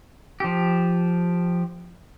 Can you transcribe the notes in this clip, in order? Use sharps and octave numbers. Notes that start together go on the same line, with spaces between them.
F3 G4